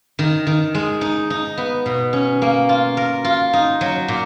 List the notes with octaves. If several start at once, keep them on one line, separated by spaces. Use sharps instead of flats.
D#3
D#3
G#3
D#4
D#4
B3
B2
C#4
A#3
F4
A#4
F4
D#4
F#3
A#2